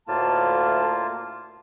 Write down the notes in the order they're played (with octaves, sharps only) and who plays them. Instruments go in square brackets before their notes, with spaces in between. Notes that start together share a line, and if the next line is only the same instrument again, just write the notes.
[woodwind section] D2 A2 A5 [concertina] A#3 F4